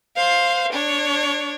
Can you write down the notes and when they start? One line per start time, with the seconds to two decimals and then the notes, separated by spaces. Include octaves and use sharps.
0.16 C5 F5
0.72 D4 C#5